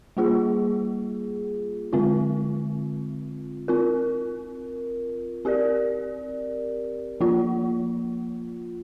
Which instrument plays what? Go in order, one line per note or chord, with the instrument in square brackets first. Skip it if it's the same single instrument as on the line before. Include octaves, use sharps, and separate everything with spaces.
[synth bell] G3 A#3 F4 G#4
D3 G#3 C4 F4
C4 F4 A#4
C4 G4 A#4 D5
F3 A#3 F4